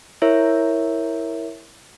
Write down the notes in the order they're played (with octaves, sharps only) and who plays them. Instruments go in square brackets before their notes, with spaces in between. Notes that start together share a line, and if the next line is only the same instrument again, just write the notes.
[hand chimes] E4 A#4 C#5 E5